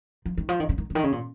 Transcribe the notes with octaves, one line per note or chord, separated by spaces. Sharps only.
F3
D#3
F3
D#3
C#3
D#3
C#3
D#3
C#3
A#2